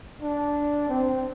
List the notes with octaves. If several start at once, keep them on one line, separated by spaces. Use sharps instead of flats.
D4
C4